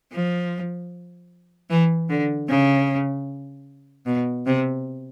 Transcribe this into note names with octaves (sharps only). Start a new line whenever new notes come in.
F3
E3
D3
C#3
B2
C3